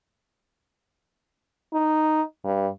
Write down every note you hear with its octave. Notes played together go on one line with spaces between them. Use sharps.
D#4
G2